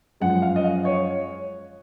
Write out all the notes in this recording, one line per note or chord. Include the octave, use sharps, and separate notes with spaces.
F#2 F3 G#3 F#5
F5
D#5
F5
C#5